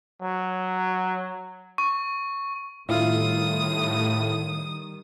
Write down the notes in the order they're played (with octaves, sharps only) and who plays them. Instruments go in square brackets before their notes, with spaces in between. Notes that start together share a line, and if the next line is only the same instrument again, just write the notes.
[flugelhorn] F#3
[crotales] C#6
[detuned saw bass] A2 [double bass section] D#3 G3 [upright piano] E4 F4 [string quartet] D#6